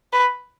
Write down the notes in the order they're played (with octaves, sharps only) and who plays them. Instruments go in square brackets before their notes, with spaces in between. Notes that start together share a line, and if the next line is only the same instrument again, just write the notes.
[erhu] B4